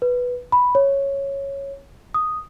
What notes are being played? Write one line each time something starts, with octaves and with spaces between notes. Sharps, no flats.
B4
B5
C#5
D#6